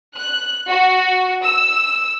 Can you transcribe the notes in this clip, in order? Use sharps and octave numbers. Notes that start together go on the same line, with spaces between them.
F#6
F#4
E6